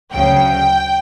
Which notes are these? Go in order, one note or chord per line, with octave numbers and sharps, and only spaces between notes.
D2 C#3 F#3 G5